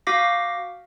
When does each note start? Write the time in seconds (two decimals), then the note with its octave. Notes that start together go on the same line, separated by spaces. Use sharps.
0.07 F#4 F5 D6 A#6 B6